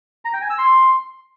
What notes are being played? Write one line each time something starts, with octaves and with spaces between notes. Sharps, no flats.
A#5
G5
G#5
E6
C6